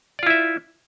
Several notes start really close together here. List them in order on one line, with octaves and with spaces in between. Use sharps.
D5 F4 E4 E5